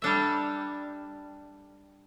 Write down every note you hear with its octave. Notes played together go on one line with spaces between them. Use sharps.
G3 D4 A4 E5